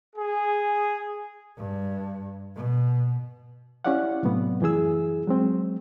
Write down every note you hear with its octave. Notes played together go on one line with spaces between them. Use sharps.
G#4
G2
B2
C#4 E4 G4 D5 F5 F#5
A2 C3 F#3 A3 B3
F#2 E3 E4 G#4 E6
F#3 G#3 C4